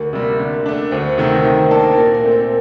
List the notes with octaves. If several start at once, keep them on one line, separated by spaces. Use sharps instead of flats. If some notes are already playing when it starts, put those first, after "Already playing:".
Already playing: D2 A#4
C3 G3 A#3
D3
A3 D4
D2 C5
C5
C3 D#3 A3
A#4
D#3 C5
A#4
A#3 D4 A4
A#4
A#2 A#4
A#4
A3 C4
C5